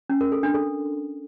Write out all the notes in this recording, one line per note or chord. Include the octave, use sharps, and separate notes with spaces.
C#4
A#4
A4
D4
A4